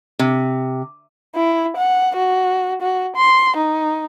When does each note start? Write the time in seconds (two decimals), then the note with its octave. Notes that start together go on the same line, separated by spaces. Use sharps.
0.19 C3
1.35 E4
1.77 F#5
2.16 F#4
2.82 F#4
3.16 C6
3.57 D#4